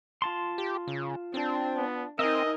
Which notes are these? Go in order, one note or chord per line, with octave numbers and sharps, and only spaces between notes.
F4 A5 C6
G4
C#3
C4 D4
B3
C4 D#4 A#4 D#5 E5 G#5